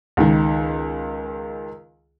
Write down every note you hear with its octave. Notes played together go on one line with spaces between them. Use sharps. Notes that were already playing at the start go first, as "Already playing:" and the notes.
C#2 D#3